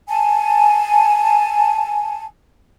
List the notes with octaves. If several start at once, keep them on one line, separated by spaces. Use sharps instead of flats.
G#5 A5